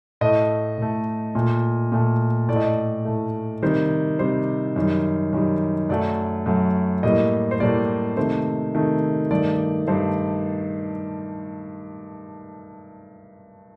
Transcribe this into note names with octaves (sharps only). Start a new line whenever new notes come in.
A2 A3 D#5
A2 A3
A#2 A3
A#2 A3
A2 A3 D5 D#5
D5
A2 A3
C3 D#3 G3 C5
C3 D#3 G3 C5
F#2 D#3 G3
F#2 D#3 G3
F#2 F#3 A3 D5
F#2 F#3 A3
A2 G3 A#3 D#5
C5
A2 G3 A#3 D5
C3 D#3 A3 C5
C3 D#3 A3
G2 D#3 A3 D5
G2 D#3 A3 C5